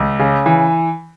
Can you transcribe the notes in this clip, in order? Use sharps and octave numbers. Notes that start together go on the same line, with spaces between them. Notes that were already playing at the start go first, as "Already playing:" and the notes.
Already playing: C#2
C#3
E3